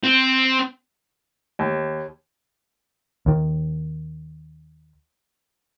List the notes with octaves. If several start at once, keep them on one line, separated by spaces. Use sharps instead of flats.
C4
D#2
D#2 D#3